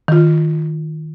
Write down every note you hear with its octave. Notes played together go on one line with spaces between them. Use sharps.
D#3 F4